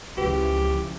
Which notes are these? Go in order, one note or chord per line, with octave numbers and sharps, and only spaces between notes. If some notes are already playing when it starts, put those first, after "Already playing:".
C#2 C#3 E3 F3 F#4 G4 B4